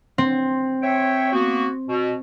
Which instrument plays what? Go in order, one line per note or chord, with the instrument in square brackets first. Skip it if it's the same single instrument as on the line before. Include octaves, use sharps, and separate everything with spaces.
[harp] C4
[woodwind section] C#5 E5 G5
A#3 B3 F#4
B2